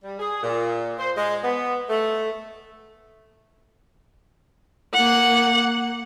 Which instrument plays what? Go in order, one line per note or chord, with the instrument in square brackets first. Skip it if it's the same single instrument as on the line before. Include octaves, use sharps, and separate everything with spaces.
[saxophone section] G3
G#4
A#2
C5
G#3
B3
A3
[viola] A#3 F#5